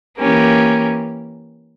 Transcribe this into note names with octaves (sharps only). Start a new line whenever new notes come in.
E3 A#3 C#4 G4 A#4